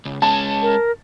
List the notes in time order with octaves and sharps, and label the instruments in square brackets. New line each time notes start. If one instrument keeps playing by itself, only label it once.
[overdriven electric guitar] C#2
[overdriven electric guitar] G#3 C#4 [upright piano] A5
[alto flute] A#4